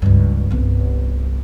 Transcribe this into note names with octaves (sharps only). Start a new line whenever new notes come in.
C#2 G2
G1 C2